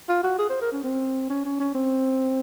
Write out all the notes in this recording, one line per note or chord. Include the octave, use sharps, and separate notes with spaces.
F4
F#4
G#4
C5
A#4
C#4
C4
C#4
C#4
C#4
C4